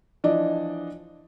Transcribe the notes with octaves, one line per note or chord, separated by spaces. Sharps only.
E3 F3 D4 D5 D#5